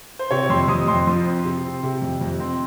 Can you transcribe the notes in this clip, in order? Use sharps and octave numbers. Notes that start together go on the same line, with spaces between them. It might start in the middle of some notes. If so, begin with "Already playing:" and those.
C5
C3 C#5
F2 C6
F2 D#6
F2 C6
F3
C4
C3
C4
C3
F2
F2
C4